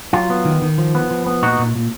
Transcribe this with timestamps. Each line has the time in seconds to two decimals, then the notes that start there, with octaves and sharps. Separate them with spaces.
0.13 F#3 F4
0.30 B3
0.45 D#3
0.62 D#3
0.78 F3
0.95 B3
1.11 F3
1.27 B3
1.42 A#2 D#4 F#4
1.59 A#2
1.76 A#2